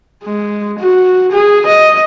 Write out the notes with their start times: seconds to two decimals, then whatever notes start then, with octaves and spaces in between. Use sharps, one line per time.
0.24 G#3
0.79 F#4
1.32 G#4
1.66 D#5